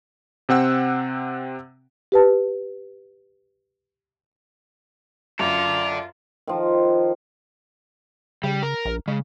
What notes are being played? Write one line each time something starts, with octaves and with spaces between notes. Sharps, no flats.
C3 C4 F#5 E6
G4 B4 A5
F#2 F4 A4 D5 F7
D#3 F3
C#3 G3
A#4
A#1
C#3 G#3